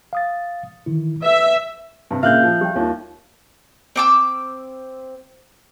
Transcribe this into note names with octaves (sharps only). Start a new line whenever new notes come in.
F5 D#6 A6
D#3 E3 E4
B4 E5
G2 C3
A#2 C#3 D4 E5 F5 F#6 G6
F3
G3 G4 G5
D#2 D#4 F4 C#5
C4 D6 E6